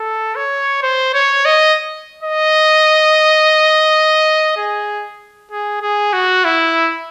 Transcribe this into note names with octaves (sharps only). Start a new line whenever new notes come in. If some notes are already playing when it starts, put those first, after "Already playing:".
Already playing: A4
C#5
C5
C#5
D#5
D#5
G#4
G#4
G#4
F#4
E4